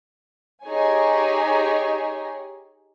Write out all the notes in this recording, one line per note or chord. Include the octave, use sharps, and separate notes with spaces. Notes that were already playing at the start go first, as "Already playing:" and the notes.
D#4 G4 G#4 C#5 G#5